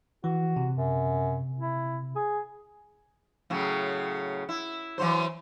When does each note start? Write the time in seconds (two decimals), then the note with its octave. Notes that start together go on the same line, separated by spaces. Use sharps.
0.24 E3 F#4
0.56 C3
0.76 F#2
1.59 E4
2.16 G#4
3.50 A2 C#3 F#3
4.49 E4
4.98 E3 F#3 C5